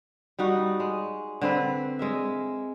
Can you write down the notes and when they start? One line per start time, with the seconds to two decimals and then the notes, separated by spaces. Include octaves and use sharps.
0.39 G3 D#4 F#4
0.80 G#3
1.41 D3 C4 B4
1.99 G#3 A#4 E5